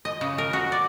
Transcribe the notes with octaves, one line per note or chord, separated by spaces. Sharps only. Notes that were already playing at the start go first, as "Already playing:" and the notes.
D#5
C#3
A#4
F#4
D5